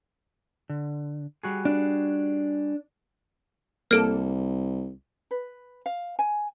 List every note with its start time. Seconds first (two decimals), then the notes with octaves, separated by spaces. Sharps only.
0.70 D3
1.43 G3 F#4 G#4
1.65 D4
3.91 C2 A#3 A4 F6 D7
5.31 B4
5.86 F5
6.19 G#5